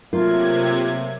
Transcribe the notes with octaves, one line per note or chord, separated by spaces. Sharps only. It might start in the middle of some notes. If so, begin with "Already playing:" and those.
C3 F#3 A3 A#3 F4 A#4 G#6